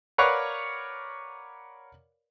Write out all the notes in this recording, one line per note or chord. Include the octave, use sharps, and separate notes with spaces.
A#4 B4 C#5 D5 F5 F#5